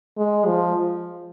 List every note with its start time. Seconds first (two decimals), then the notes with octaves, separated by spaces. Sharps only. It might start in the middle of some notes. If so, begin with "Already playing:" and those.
0.18 G#3
0.46 F3